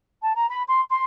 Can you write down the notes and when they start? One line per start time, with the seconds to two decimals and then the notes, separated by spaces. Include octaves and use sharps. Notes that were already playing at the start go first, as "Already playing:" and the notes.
0.22 A5
0.35 A#5
0.48 B5
0.68 C6
0.89 C6